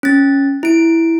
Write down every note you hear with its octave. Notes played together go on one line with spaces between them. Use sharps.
C#4 A6
E4 D7